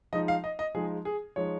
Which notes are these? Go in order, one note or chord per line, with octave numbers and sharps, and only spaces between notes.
F3 G#3 D#4 D#5
F5
D#5
D#5
F3 G#3 D#4 G#4
G#4
F3 G#3 D#4 C#5